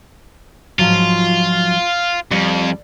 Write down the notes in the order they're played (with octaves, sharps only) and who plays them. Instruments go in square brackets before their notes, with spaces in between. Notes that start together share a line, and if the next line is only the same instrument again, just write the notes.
[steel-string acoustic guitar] G#2 F3 F#3 [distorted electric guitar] F4
[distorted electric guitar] F2 [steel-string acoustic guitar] G3